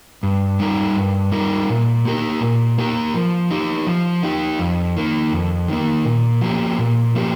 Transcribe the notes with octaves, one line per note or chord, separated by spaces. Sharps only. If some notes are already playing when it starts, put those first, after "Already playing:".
G2
G3 D#4 A#4
G2
G3 D#4 A#4
A#2
A#3 G4 A#4
A#2
A#3 G4 A#4
F3
D#4 G4
F3
D#4 G4
F2
D#3 A#3
F2
D#3 A#3
A#2
F3 A#3 G4
A#2
F3 A#3 G4